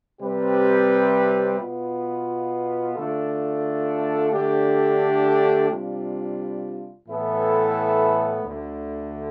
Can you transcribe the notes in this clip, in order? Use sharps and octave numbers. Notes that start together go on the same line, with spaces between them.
C3 G3 C4 G4 B4
B2 B3 F4
D3 A3 D4 F4 A4
D3 A3 D4 G4
C3 G3 D4 F4
A2 E3 B3 E4 A4
D2 D3 A3